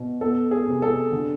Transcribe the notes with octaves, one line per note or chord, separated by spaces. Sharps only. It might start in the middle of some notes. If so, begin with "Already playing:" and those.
Already playing: B2
B3 A4
G#4
C3
A4
D3